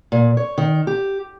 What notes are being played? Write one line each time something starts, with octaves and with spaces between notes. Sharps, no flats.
A#2
C#5
D#3
G4